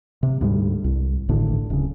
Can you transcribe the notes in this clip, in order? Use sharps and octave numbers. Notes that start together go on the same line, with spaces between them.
C3
D2 G#2 G3
C2
G#1 A2 D3
D1 C#3